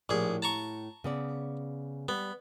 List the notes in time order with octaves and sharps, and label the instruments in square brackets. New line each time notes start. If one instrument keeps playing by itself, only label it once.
[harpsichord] A#1 G#4 [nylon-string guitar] A2 G4
[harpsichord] A5 A#5 C#6
[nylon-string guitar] C#3 B3 D5
[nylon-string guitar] G3 [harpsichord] B3